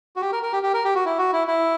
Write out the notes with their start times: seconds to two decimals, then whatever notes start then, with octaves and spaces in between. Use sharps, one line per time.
0.16 F#4
0.21 G4
0.33 A#4
0.43 A#4
0.53 G4
0.63 G4
0.74 A#4
0.85 G4
0.95 F#4
1.05 E4
1.19 F#4
1.33 E4
1.47 E4